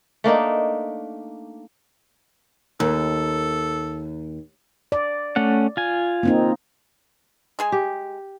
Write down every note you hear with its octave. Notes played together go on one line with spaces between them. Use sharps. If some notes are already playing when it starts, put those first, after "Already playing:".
A3 A#3 D4 D#4
D#2 A4
D5
A3 C#4 F#5
F4 G#5
A#3 C4 D#4
G#3 G#4 G#5
G4